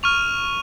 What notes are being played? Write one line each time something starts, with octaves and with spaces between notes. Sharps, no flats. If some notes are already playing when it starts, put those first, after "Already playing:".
C#6 F6 D#7 F7